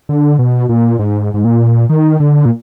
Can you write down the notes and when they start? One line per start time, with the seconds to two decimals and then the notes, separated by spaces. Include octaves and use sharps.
0.09 D3
0.39 B2
0.69 A#2
0.99 G#2
1.34 G#2
1.44 A#2
1.89 D#3
2.20 D3
2.45 A#2